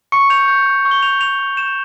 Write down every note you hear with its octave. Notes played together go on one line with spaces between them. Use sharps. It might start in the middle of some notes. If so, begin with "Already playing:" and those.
C#6 C#7
G6 F7
G6
C#6
C#6
G7
G6 F7
G6 F7
C#6
G6 E7